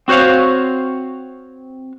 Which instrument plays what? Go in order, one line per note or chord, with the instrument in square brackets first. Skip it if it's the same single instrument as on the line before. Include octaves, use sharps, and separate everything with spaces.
[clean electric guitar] C4 F#4 C5 C#5 F5